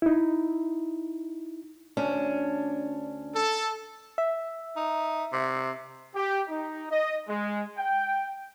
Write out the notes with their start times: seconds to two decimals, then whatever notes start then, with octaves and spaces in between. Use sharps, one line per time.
0.02 D#4 E4
1.97 D2 C#4 D4
3.35 A4
4.18 E5
4.76 D#4
5.33 C3
6.14 G4
6.48 D#4
6.90 D#5
7.28 G#3
7.77 G5